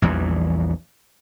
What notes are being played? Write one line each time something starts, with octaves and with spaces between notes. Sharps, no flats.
A#1 E2 E3 G3